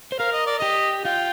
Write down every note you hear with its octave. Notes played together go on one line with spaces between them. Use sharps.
C5
A#4 F5
D#5
D5
G4 D#5
F4 G5